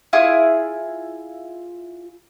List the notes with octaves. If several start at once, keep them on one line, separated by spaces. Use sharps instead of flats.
E4 F4 G#4 D#6